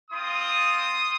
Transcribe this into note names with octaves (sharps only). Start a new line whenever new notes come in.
C4 F4 C6 D#6